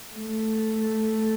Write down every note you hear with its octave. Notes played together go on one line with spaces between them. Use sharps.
A3